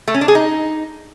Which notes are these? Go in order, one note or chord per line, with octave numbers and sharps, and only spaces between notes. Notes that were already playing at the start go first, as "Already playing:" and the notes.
A3
C#4
D4
G#4
D#4